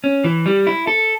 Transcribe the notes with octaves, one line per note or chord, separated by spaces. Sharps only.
C#4
E3
G3
E4
A4